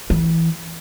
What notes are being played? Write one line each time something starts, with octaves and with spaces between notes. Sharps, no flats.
E3